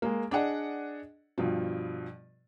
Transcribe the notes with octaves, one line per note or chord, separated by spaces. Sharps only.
G#3 A#3
D4 G#4 D5 D#5 F#5
G2 B2 F3